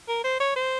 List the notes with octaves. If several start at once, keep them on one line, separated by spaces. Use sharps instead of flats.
A#4
C5
C#5
C5